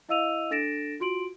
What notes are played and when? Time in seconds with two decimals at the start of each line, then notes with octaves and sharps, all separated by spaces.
0.09 E4 D#5 F5 E6 D#7 F7
0.51 D4 A4 A6 A#6 D7 E7
1.00 F4 F#4 C6 D7 F#7